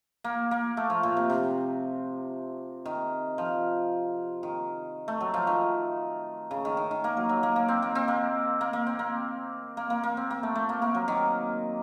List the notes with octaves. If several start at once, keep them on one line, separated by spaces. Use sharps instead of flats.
A#3
A#3
A3
F3
A#2
C3
C3
D#3
F3
D#3
A3
F#3
F3
D#3
C#3
D#3
D#3
D#3
A#3
F#3
F#3
A#3
A#3
C4
A#3
C4
A#3
A#3
A#3
C4
A#3
A#3
A#3
A#3
C4
A#3
A3
A3
A#3
A#3
F#3
D#3